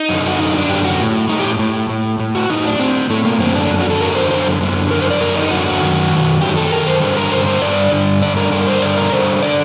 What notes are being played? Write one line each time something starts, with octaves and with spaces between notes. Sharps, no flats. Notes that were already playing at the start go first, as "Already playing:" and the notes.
Already playing: D#4
F#2 D3
F#4
F#2 D3 D#4
D4
F#2 D3 G4
F#4
A2
A2 D#4
G4
A2
A2
A2
F#4
A2 D#4
D4
A2 C4
A2 A3
A#3
F#2 D3 C4
D4
F#2 D3
F#4
A4
F#2 D3 A#4
C5
F#2 D3 C5
F#2 D3
F#2 D3 A#4
C5
D5
F#2 D3 A#4
D#4
F#2 D3 F#4
F#4
F#2 D#3
F#2 D#3
F#2 D#3 G4
A4
F#2 D#3 A#4
C5
G2 D3 C5
A#4
G2 D3 C5
C5
G2 D3 D5
G2 D3
G2 D3 D5
A#4
G2 D3 A#4
C5
G2 D3 D5
A#4
G2 D3 C5
D3 D5